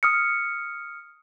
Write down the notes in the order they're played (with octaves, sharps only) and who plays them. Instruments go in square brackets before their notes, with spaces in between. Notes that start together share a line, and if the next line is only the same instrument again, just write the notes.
[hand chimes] D#6 F6 C#7